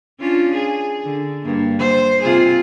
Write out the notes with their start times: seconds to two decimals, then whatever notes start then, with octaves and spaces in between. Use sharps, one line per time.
0.20 C#4 D4 F4
0.54 G#4
1.04 D3
1.42 G2 A#3
1.79 C5
2.22 C3 F4 G#4